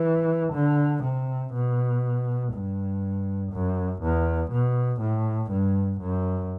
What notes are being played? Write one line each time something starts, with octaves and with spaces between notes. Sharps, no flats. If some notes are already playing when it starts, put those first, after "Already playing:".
Already playing: E3
D3
C3
B2
G2
F#2
E2
B2
A2
G2
F#2